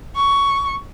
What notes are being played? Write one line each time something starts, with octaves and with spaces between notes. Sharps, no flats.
C#6